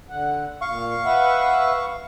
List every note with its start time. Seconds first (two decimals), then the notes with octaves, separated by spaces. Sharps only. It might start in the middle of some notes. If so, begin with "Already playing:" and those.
0.10 D3 F#5
0.61 A#2 F5 C#6
1.05 B4 E5 F#5